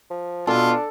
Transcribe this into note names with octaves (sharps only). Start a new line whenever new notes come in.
F3
B2 D4 F4 A4